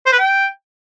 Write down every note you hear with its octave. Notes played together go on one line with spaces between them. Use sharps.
C5
B4
G5